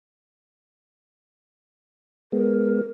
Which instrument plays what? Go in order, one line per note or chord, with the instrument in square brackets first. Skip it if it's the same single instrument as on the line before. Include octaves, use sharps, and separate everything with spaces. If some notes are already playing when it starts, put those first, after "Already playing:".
[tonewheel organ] G#3 B3 [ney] A#4